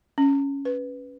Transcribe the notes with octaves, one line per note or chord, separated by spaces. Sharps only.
C#4
B4